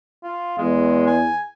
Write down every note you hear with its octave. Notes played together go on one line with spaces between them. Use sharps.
F4
E2 G#3
G#5